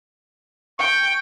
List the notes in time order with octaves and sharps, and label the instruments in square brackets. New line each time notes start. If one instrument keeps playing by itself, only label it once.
[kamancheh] G5 [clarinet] C#6